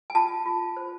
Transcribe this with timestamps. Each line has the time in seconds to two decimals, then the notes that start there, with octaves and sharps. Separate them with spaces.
0.10 G#5
0.15 F4 A5
0.46 F4
0.77 C5